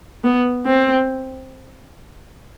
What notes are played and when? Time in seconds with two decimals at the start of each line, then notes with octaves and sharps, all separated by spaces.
0.24 B3
0.66 C4